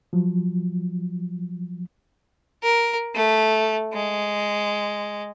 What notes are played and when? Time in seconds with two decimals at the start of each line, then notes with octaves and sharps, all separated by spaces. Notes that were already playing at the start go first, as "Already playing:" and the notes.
0.13 F3 F#3
2.62 A#4
3.14 A3
3.93 G#3